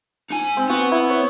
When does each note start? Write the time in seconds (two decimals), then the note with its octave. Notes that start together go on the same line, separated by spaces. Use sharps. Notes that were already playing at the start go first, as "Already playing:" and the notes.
0.31 D#4 G#5
0.57 C4
0.69 B3 F#4
0.92 E4
1.10 C#5